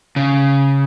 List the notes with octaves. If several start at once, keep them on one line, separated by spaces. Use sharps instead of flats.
C#3